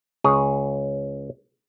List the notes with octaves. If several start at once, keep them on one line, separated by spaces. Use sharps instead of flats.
C#2 G#4 C#5